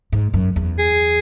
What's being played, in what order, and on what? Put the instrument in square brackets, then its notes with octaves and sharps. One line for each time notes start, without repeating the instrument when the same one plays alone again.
[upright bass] G#2
F#2
E2
[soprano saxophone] G#4